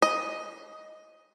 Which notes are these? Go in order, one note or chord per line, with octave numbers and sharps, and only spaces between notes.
D#5